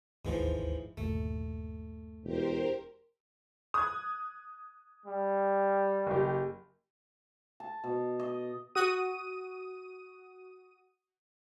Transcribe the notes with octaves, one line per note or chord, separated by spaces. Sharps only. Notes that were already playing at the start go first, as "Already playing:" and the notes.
D1 G#1 D#2 G#2 E3 F3
G1 D#2 A#2 A3
E1 G4 A#4 C5
D#6 F#6 G#6
G3
F#1 G4
A5
B2
D#5
F#4 D#6 D#7